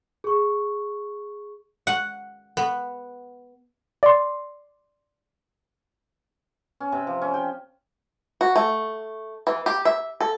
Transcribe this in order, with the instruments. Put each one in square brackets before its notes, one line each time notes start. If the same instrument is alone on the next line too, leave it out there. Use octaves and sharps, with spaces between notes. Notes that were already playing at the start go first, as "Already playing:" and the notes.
[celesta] G#4 C#6
[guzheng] F#5
B3
[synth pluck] D5 C6
[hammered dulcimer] C#4
C3
F3
C#4
G5
[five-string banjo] F#4
A3
E3
G4
E5
A4